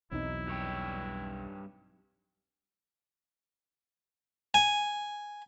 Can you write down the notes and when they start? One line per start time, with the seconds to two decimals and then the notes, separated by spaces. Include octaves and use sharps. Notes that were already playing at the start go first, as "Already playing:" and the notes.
0.12 B1 E2 F#3 C4 D#4 E4
0.47 G2 C#5 G5
4.54 G#5